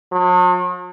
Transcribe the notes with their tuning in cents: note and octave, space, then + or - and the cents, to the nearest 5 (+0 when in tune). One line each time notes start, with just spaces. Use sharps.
F#3 -45